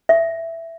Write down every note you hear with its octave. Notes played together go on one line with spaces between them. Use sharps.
E5